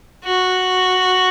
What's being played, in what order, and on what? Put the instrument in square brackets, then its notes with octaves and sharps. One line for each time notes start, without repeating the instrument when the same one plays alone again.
[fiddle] F#4